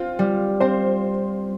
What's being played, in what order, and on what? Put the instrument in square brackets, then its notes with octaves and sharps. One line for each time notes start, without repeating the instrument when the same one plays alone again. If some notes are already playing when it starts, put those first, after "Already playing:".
Already playing: [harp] C4 [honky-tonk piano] F4
[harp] G3
[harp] C4 [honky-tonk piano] C5